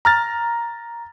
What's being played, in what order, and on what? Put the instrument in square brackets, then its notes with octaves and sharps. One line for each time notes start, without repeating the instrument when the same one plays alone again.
[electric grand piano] A#5 F6 A6